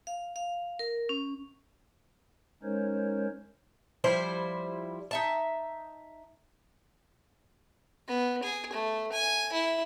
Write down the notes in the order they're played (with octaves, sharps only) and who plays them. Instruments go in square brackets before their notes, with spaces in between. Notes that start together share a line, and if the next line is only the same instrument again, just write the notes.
[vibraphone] F5
F5
A#4
C#4
[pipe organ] G#3 C#4 D#4 A#4 C5 C#5
[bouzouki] F3 G3 E4 C5
D#4 E5 A5
[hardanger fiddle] B3
G#4
A3
G#5
E4